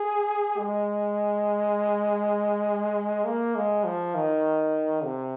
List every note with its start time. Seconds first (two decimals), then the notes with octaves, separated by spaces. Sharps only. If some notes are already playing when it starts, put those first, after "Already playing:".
Already playing: G#4
0.58 G#3
3.25 A#3
3.55 G#3
3.85 F3
4.15 D#3
5.04 C3